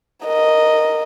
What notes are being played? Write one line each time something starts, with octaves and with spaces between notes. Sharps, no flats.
A#4 D#5